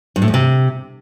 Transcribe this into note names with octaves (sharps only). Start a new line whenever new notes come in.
G2
A2
E2
C3